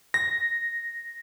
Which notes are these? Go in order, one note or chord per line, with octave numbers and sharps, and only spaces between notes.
A#6